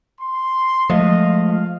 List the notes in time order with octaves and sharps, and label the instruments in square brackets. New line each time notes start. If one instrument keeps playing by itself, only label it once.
[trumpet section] C6
[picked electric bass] F3 G#3 A3 [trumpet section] D#5 F5
[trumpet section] F5